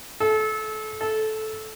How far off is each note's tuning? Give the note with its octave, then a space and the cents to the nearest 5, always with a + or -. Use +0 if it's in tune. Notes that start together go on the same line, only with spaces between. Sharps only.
A4 -30
A4 -15